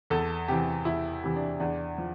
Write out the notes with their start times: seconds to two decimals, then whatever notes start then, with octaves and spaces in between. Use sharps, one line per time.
0.10 E2 A4
0.48 C3 E3 G4
0.85 E2 E4
1.24 C3 E3
1.36 D4
1.60 E2 D4
1.98 F3